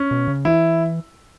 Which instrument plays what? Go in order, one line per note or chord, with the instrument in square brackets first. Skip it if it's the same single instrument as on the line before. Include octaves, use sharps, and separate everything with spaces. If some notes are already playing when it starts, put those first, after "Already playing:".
Already playing: [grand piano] C#4
[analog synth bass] B2
C#3
[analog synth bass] E3 [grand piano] E4